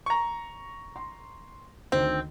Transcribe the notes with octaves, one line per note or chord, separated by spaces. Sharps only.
A#5 C#6
C6
D2 D#3 C4